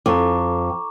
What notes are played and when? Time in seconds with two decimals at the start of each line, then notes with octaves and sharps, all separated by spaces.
0.06 F2 A#5 C#6 D6